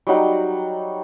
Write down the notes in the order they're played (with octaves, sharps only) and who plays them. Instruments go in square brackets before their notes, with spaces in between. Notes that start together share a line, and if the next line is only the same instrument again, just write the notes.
[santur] F#3 G3 D#4 F#5